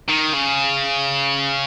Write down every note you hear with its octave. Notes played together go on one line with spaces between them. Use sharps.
D#3
C#3